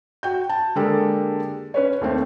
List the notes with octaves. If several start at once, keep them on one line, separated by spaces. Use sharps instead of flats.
F#4 G5 G6
A5
D3 G#3 A#3 G4 A4 A#4
C#4 B4 C#5
D#2 A3 C4